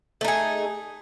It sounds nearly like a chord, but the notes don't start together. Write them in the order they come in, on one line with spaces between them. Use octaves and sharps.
A3 D#4 G#4